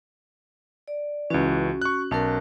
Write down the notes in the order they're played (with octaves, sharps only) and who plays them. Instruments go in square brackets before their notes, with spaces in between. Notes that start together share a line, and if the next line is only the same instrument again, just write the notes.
[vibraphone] D5
[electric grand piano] C#2 E3 [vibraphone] C#4 F#4
[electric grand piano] C#6 F#6
[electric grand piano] B1 A5 [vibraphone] C#4 A#4